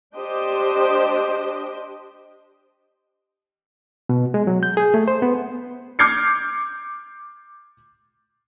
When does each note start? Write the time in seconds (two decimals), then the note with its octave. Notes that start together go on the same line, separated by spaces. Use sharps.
0.15 D4 G4 C5 D#5 G5
4.09 B2
4.34 G#3
4.47 F#3
4.63 G6
4.77 G#4
4.94 A3
5.08 C5
5.22 B3
5.99 D6 F6 G6 G#6 C7 C#7